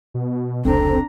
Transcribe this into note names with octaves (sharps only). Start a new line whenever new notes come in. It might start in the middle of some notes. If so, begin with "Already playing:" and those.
B2
F1 C#2 C4 D4 A4 A#5